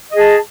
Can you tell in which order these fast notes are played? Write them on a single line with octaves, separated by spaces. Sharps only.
D#5 G#4 A5